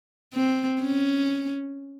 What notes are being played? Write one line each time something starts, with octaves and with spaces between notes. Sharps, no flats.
C4
C#4